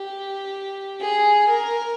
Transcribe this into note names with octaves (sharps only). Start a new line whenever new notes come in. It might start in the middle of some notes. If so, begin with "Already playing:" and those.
Already playing: G4
G#4
A#4